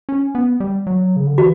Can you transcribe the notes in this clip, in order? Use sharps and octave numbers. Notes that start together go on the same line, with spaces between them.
C#4
B3
G3
F#3
C#3
D3
E3 F#4